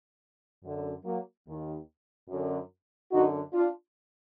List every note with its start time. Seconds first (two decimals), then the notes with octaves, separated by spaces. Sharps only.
0.64 F#2 D3
1.05 F#3 A#3
1.46 D#2 D#3
2.29 F#2 D3
3.11 F#2 D3 D#4 F#4
3.53 D4 F4